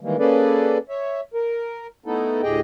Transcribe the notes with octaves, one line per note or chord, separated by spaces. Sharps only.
D#3 E3 G3 G#3 A#3
A#3 C#4 G#4 A4 B4 D5
C#5 E5
A#4
A3 B3 D#4 E4 A4
D2 A2 G4 G#4 D#5 G5